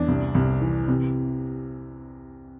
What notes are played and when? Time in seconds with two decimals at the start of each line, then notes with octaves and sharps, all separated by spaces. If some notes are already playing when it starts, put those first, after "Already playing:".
Already playing: E2 D4
0.08 C2
0.35 C2
0.61 E3
0.88 C3